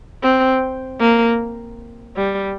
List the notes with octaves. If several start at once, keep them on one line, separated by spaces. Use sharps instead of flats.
C4
A#3
G3